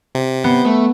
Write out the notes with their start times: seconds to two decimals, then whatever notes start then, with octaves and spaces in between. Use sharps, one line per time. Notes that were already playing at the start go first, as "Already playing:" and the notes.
0.15 C3
0.44 B3 C5
0.66 A3